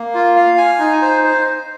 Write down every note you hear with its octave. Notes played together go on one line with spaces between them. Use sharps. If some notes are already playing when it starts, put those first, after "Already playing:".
Already playing: A#3
F4
F5
G#5
D#4
C5
C5